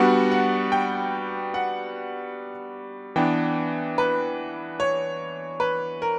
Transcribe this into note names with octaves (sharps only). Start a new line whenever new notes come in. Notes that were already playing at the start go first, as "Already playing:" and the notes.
Already playing: G3 B3 D4 F#4 F#5
F#5
G5
F#5
E3 B3 D4 G5
B4
C#5
B4
A#4